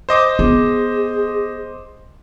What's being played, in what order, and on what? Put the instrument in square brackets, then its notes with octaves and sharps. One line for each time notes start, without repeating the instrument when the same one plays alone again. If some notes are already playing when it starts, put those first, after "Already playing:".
[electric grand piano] C5 D#5 D6
[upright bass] B3 [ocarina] G#4